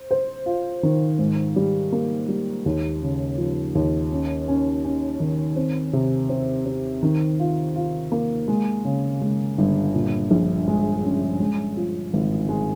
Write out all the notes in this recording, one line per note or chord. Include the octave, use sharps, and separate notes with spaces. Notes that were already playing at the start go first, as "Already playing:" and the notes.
Already playing: C5
C5
F4
D#3
G#2
G3
A#3
G3
D#2
C#3
F3
D#2
C#4
C#4
C#4
D#3
C4
C3
C4
C4
D#3
F4
F4
A#3
G#3
C#3
G#3
G1
A#2
A#1
G#3
C#4
G#3
F3
G#1
G#3